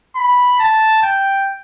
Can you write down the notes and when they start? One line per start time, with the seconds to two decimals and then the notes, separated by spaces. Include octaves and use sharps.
0.16 B5
0.60 A5
1.03 G5